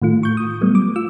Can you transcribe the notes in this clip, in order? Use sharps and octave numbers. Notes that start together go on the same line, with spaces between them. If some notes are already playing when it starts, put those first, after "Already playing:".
A2 D#3 A3 F4
C#6 G6
D#6
F#3 G3 A3 B3
D6
F4 E6